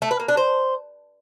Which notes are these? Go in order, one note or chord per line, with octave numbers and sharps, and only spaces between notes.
A3
B4
A#3
D4
C5